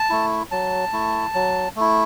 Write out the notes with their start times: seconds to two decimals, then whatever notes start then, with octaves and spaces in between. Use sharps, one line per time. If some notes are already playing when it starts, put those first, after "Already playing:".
Already playing: A5
0.10 A3 E4
0.51 F#3 A5
0.92 A3 E4
1.35 F#3
1.76 A3 E4